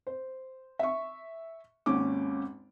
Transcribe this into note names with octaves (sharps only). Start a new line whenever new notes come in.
C5
E5 C#6
G#1 D#2 C#4 D6